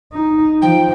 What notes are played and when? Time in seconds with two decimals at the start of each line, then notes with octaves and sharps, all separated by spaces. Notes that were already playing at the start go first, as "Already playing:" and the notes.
0.12 D#4
0.62 F3 G5